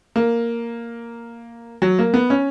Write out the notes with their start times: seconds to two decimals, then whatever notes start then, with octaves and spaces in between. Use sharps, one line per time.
0.16 A#3
1.82 F#3
1.99 A#3
2.14 B3
2.30 C#4